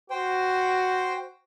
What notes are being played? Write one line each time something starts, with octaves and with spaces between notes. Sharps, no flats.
F#4 C5 G5